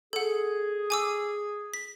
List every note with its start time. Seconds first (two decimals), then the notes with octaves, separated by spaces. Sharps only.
0.13 G#4 A4 F#5
0.90 G#5 D6 E6
1.74 B6